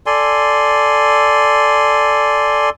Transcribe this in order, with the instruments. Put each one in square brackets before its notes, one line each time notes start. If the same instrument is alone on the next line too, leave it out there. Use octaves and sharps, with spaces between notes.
[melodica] A4 D5 G#5 C6